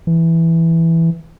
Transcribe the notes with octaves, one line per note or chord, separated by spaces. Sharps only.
E3